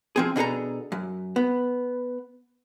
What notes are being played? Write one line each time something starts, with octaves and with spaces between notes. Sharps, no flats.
F3 C4 G#4
B2 D4 G#4 A4 A#5
F#2
B3